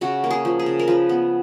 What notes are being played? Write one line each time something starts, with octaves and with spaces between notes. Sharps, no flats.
C#3 F#4
A#3
G#4
F3
G#4
C#3
A#4
F3 B4
B3